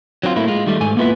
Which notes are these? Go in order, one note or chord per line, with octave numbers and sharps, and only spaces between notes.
F#3 C4 D4 F4
A2 A#3 E4
G#3 F4
D#3 G3 A3
G#2 A3 G#5
A#3 B3 E4 F4 B4 E5